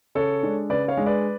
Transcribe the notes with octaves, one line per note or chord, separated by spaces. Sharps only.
C#3 A4 C#5
G#3 D4
C#3 B4 D5
C#5 F5
G#3 D4
B4 D5